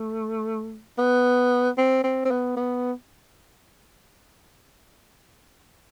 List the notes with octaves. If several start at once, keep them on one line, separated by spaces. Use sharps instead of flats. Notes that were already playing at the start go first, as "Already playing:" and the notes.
Already playing: A3
B3
C4
C4
C4
B3
B3